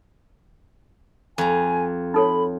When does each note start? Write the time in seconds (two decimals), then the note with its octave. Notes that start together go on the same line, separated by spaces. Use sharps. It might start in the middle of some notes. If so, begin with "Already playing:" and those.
1.38 F2 G#5 A#5
2.14 D#4 A4 C#5 B5